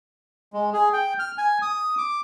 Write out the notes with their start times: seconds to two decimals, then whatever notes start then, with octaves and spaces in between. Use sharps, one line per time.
0.53 G#3
0.73 G#4
0.93 G5
1.19 F6
1.38 G#5
1.62 D#6
1.98 D6